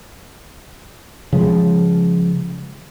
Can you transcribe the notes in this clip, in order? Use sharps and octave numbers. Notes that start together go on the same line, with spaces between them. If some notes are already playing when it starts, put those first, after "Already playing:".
C#3 F3 G#3